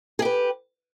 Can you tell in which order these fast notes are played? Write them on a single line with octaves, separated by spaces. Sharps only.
G#4 G4 B4